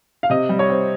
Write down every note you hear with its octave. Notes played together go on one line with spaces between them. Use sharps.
F5
C3 D#5
G3
C#5
C4